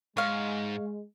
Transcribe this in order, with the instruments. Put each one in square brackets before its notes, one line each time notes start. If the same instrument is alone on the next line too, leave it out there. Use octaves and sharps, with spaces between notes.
[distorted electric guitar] G#2 [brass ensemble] G#3 [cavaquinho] C#5 F5